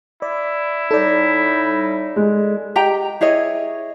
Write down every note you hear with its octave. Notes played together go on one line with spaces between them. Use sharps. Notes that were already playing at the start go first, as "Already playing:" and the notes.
E4 D5
A2 G3 D#4 A4 D5
G#3
G4 D#5 G5 A#5
E4 G#4 C#5 D#5